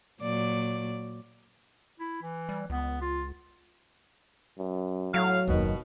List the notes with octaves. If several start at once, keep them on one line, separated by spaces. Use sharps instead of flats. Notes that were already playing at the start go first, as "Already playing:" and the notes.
A#2 F#3 D5
E4
E3
G3
C#2 B3
F4
F#2
A2 F#3 F5
F#1 D#2 B2 D#3